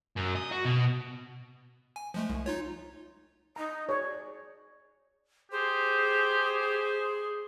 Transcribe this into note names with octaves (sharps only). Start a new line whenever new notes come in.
F#2
D#5
F#4
B2
G#5
F3 G#3 A3
C2
D#4 F4 C#5
D#4 A#5
G#4 C#5 D5
G4 G#4 C5